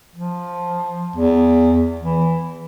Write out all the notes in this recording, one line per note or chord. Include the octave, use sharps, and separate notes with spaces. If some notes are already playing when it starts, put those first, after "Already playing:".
F3
E2
E3